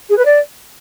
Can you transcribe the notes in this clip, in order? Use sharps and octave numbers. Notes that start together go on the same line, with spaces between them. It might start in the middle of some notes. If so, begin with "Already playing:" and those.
G#4
B4
D5